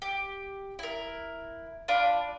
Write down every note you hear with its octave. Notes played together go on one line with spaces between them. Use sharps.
G4
E4 A#4
D4 F4 B5 D6